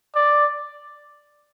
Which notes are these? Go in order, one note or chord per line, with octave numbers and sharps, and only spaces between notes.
D5